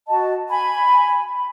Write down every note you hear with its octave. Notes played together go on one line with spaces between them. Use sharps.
F#4 D#5 A5
G#5 B5